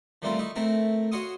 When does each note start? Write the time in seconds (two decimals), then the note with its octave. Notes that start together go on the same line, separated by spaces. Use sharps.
0.22 E3 G3 A3 A#3 C4 F4
0.38 D#4 E4 C#6
0.55 A3 C4 E4 A#4
1.12 F#4 C#5 F5 C6 C#6 D#6